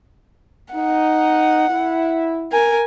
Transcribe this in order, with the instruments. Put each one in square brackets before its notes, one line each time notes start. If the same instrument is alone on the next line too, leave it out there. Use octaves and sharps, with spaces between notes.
[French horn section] D#4 [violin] F#5
[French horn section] E4
[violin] A#4 G#5